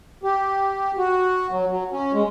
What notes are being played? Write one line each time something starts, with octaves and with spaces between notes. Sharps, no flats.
G4
F#4
F#3
F#3
C#4
G#3